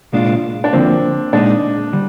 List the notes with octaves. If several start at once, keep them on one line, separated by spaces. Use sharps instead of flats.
C2 A#2 G#3 D4 F4
D4
D2 D3 F3 A#3 C4
A#2 G#3 D4 D#4
D3 G3